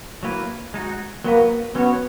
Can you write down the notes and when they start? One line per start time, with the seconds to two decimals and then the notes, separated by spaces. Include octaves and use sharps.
0.23 F#3 A#3 E4 B4
0.74 G#3 D#4 F#4
1.24 F#3 A#3 B3 F#4 B4
1.75 F#3 B3 C#4 F#4 C#5